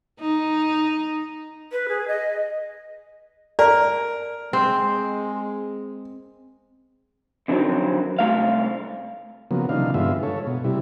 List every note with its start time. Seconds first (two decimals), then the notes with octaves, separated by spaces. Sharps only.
0.20 D#4
1.72 B4
1.88 G#4
2.07 D#5
3.59 A#4 D5
4.53 G#3 C4
7.48 F2 D3 D#3 F#3 C4
8.19 C2 A3 F5
9.51 C#3 F3 F#3 A#3 B3
9.69 C3 E3 D4 D#4 F5
9.94 G2 D3 G#3 B3 F4 E5
10.23 A4 C#5
10.47 B2
10.64 C3 G3 E4